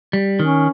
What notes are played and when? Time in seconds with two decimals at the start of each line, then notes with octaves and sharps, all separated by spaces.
0.13 G3
0.39 D#3 C#4